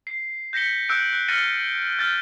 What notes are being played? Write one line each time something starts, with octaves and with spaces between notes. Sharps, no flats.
C7
G6 A#6 B6 C#7 G7
E6 F#6 G6 D7
F#6
F6 F#6 A6 A#6 C#7 D#7
F6 G6 A6